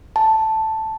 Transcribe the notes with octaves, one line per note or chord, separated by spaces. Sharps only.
A5